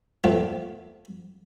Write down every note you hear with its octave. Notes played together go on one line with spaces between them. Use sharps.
A#2 A3 B3 C4